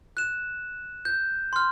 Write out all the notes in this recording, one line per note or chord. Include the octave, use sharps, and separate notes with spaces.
F#6 E7
G6
C6 F6